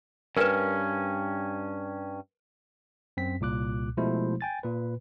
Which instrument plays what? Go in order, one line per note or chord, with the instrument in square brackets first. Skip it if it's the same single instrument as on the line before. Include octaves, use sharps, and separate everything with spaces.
[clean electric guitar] G2 C#4 [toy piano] A#4 B4
[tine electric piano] F#2 C4 B6
C2 A#2 D6 F#6
B2 F3 G#3 A3 E4 C5
G5 G#5 A6
A#2 B4